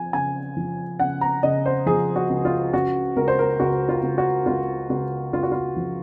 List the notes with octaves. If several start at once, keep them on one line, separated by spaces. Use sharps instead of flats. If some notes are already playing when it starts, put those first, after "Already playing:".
Already playing: F3 G#5
C#3 G#5
F3
C#3 F#5
A#5
C#3 D#5
C5
F3 G#4
F#4
C#2
F4
C#3 F#4
C#2 A#4
C5
A#4
C#2 F#4
F4
C#2
F#4
C#2 F4
C#2 F#4
C#2 F4
F#4
F4
F3